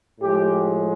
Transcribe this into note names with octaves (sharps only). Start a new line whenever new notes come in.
A2 F3 G#3 G4